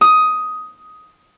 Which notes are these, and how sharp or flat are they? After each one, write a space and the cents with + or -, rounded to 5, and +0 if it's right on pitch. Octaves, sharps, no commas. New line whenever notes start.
D#6 +10